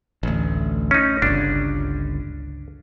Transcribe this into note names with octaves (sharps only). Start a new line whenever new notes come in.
A1 D2
C#4 D#4
G1 C#2 D4